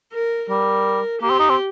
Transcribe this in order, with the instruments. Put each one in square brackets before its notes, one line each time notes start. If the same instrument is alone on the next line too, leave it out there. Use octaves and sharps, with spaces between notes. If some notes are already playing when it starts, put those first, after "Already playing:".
[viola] A#4
[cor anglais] G3 [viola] A#4
[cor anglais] A#3 [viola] G4
[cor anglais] C4
D#4
C4